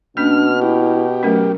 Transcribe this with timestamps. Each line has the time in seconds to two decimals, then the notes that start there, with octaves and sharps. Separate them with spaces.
0.17 B2 A#3 C#4 D4 F6
0.62 E4 G4
1.23 F#3 A3 C#4 A#4